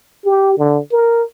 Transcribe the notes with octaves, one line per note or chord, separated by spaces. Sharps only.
G4
D3
A#4